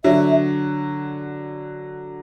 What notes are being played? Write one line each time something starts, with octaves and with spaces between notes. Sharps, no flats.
D3 F#3 E5